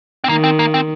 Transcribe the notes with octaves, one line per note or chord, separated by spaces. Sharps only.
C4
D#3 A#3
C4
A#3
C4